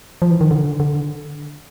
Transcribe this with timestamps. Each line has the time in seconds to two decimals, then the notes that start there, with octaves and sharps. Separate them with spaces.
0.22 F3
0.31 E3
0.41 D#3
0.51 D3
0.80 D3